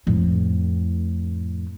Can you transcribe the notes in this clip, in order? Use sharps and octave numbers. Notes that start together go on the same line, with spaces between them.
F2 A2